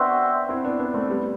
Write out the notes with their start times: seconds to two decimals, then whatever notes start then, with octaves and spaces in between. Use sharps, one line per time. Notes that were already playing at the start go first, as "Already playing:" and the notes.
Already playing: B3 C4 D4 F#4 C5 E5
0.49 C4 E4
0.64 B3 D4
0.79 B3 D4
0.94 A3 C4
1.09 G3 B3